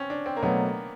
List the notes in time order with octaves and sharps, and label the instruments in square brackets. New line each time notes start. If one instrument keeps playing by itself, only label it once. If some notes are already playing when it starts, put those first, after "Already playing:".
Already playing: [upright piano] C4 C#4
D4
C4
A#3
[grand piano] B2 F#3 A3 [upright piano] B3